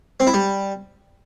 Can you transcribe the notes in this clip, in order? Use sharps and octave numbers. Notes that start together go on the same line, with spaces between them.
C4
E4
G3